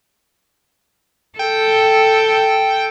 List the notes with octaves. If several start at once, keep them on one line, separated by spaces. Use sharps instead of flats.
A4 G5